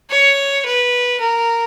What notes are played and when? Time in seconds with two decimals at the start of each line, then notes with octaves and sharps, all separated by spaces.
0.10 C#5
0.65 B4
1.20 A#4